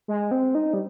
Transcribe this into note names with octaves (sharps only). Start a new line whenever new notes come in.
G#3
C4
D#4
G3